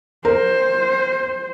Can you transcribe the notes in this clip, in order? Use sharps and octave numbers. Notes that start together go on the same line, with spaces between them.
A#4 C5